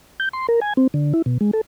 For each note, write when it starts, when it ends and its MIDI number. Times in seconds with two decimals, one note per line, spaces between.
0.20 0.29 91
0.33 0.47 84
0.49 0.60 70
0.61 0.73 80
0.77 0.87 60
0.94 1.13 50
1.14 1.22 64
1.26 1.38 47
1.41 1.51 56
1.53 1.61 69